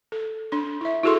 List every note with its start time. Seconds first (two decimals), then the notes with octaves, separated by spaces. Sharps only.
0.12 A4
0.52 D4 C6
0.81 E4 E5
1.04 E4 F#4 G#4 A4 C6